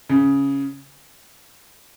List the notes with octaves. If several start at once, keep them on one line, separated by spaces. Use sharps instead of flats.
C#3